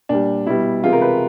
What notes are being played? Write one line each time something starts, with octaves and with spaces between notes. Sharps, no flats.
A#2 G3 D4
B2 G3 E4
C3 E3 G#3 F4
A#4
B4